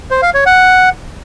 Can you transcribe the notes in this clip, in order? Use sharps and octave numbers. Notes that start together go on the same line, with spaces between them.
C5
F5
C#5
F#5